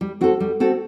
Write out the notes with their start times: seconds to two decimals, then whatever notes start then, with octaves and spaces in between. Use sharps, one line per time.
0.01 G3
0.21 C4 F#4 A4
0.40 G3
0.60 C4 F#4 A4